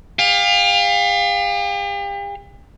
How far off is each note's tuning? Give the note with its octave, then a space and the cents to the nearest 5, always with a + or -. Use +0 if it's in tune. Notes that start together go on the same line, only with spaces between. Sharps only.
G4 +45 F5 +20